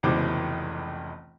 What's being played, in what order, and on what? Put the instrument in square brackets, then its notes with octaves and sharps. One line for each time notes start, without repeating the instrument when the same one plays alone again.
[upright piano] F1 C#2 B2 E3 C5 D6